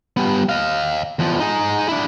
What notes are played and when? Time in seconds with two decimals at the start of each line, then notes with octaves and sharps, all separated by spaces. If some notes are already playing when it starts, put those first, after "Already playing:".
0.17 G3 B3
0.49 D#5 F5
1.19 E2 F3
1.40 D#4 G#4
1.88 D4 E4